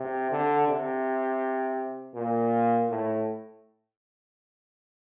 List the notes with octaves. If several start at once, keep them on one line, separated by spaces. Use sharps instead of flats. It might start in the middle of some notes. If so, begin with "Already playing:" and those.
Already playing: C3
D3
C3
A#2
A2